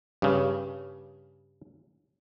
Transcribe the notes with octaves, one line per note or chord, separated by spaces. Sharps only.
G2 C#3